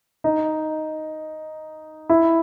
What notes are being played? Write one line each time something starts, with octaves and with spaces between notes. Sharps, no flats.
D#4
E4